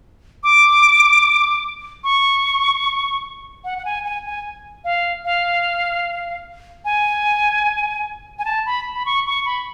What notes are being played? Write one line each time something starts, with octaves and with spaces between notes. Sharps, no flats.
D6
C#6
F#5
F#5
G#5
G#5
G#5
F5
F5
G#5
G#5
A5
B5
B5
C#6
C#6
B5